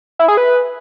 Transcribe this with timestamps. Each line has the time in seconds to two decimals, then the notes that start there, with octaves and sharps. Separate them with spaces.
0.19 E4
0.28 G#4
0.37 B4